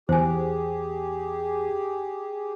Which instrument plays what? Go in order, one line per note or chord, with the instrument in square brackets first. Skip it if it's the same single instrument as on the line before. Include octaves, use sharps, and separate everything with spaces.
[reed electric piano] E2 [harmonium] G4 G#4 [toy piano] C5 G#5